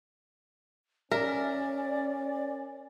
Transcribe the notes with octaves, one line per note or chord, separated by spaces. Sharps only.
C#4 A#4 D5 E5